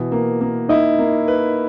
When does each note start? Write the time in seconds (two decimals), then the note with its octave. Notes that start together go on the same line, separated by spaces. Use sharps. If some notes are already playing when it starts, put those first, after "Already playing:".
Already playing: B2 E3
0.12 A#3
0.41 A#3
0.69 D#4 E4 D#5
0.99 A#3
1.28 B4